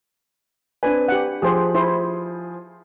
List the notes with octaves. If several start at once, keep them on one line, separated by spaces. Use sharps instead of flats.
C4 D4 B4 G#5
G4 F#5
F3 G4 G#4 C5
E4 C5